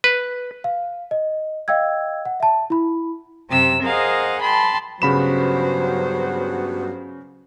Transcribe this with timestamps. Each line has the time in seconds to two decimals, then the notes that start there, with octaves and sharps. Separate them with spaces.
0.04 B4
0.64 F5
1.11 D#5
1.68 D#5 F5 G5 E6 G#6
2.25 F#5
2.40 E5 A5
2.70 E4 B5
3.48 F#2 C3 C4 G4 E6
3.82 G#4 A#4 C5 D#5 F5 F#5
4.41 G5 A5 B5 C6
5.02 G2 C#3 F#3 B3 F#4 C5 B5 E7